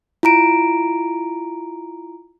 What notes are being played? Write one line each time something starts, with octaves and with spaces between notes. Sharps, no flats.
E4 F4 A#5 D7